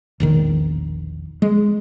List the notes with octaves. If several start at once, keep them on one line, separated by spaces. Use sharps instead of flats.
E1 A#1 D#3
G#3